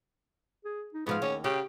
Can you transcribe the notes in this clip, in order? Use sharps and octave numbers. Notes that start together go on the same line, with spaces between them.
G#4
D#4
G#2 F3 B3 G#4 F5
D#2 C#4
C#3 G4 G5